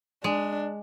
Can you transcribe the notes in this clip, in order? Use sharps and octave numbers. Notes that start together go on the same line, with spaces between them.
G#3 D4